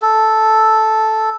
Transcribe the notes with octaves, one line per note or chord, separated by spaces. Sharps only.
A4